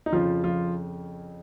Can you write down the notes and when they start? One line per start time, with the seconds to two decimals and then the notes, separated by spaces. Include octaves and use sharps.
0.06 D#4
0.12 F2 C#3 F3 F4
0.44 F3 F4